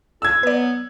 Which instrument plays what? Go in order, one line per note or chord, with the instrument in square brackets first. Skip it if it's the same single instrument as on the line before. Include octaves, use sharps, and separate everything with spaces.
[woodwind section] F4 A4 [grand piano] E6 G#6
[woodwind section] F#3 B3 [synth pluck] B4 D5